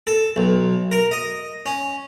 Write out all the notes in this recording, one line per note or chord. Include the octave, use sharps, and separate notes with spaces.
A4
B1
A#4
D#5
C#4